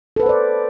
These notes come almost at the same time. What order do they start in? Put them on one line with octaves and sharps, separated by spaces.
A4 B4 F#5 C5 D5